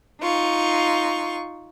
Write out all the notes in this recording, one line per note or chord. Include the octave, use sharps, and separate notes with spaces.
D#4 F4 C#6